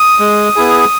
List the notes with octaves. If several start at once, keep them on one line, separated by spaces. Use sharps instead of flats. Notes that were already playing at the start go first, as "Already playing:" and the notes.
Already playing: D#6
G#3
B3 E4 G#4